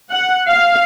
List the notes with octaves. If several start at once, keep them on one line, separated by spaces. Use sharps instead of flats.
F#5
F5